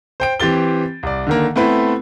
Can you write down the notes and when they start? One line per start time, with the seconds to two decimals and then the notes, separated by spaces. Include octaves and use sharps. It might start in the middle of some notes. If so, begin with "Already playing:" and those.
0.20 C5 G5 D7
0.40 E3 C4 G4 A6 G7
1.03 C2 D5
1.27 D3 D#3 A#3
1.56 A3 B3 C4 E4 B4